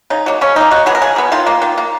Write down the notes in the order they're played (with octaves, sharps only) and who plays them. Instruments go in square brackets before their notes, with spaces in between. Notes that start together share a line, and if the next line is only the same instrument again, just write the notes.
[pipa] C#3 D#4
F#3 A#3
C#3 C#4
F#3 A#3 D#4
C#3 F#4
F#3 B3 G#4
A#4
C#3 G#4
F#3 B3
D#3 F4
A#3
D#3
A#3